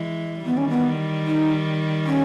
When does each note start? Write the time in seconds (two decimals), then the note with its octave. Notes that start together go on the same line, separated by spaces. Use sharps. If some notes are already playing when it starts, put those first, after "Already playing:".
Already playing: E3 G#3
0.45 D#3 G3 B3
0.57 C#4
0.70 B3
1.26 D#4
2.06 C#4